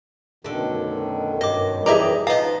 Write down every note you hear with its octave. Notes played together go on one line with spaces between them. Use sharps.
F#2 B2 D3 D#3 A3
G2 D#5 D6
E3 E4 G4 G#4 D5 D#5 A#5
F3 B3 D#4 D#5 F5 A#5